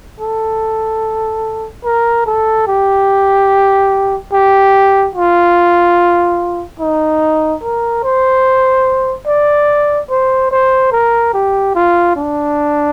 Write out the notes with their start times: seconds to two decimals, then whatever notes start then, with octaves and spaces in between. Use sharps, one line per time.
0.20 A4
1.85 A#4
2.26 A4
2.67 G4
4.33 G4
5.15 F4
6.80 D#4
7.63 A#4
8.04 C5
9.27 D5
10.10 C5
10.52 C5
10.92 A#4
11.34 G4
11.75 F4
12.16 D4